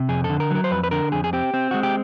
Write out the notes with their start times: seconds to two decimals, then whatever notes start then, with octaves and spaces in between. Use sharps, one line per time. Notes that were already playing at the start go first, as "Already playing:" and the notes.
Already playing: C3
0.09 F2 G#4
0.24 A4
0.29 D3
0.40 A#4
0.51 F#3 A#4
0.64 C5
0.71 F2 B4
0.84 B4
0.91 D3 A#4
1.12 F2 G#4
1.24 G#4
1.33 C4 G4
1.54 C4
1.71 G#3 F#4
1.83 G4